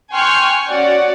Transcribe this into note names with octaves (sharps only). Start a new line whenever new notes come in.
G5 G#5 C6 C#6 F6 F#6
C#4 F#4 D5 F#5